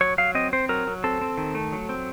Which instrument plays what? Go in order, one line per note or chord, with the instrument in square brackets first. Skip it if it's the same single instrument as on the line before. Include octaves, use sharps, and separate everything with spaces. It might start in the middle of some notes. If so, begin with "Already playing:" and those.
[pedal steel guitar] F#3 C#5
F#3 F5
C4 D#5
C4 C5
F#3 A#4
F#3
C4 A4
C4
D#3
A3
F#3
C4